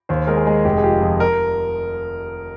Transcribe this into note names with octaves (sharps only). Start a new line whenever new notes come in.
D#2 C5
G#3 A#4
G#4
G#3
F1 G4
G#4
F3 G4
F2
A#4